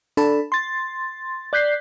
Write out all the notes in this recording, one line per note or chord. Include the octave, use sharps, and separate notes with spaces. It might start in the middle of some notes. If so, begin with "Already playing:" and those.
D4 A4 B5
C6 A6
D5 F#6 G6 B6 C7